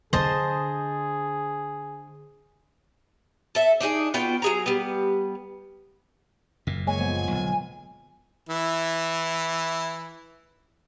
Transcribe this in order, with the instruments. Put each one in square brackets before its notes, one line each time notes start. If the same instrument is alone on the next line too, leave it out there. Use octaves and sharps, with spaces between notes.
[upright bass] D3 D4 [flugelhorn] G#4 [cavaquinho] C5 D#5 A5
[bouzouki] A4 E5
D4 D#4 F#4 G#4
B3 F4 F#4 G5
F#3 G#4 A#5
G3 B3
[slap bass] F#1 A#2
[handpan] G#3 A#3 C#5 [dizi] G#5
[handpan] F3 G#3 B3
[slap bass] D1 B1
[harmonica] E3 E4